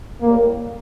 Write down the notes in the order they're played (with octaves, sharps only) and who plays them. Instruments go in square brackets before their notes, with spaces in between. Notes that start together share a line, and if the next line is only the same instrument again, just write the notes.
[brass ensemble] A2 G3 A#3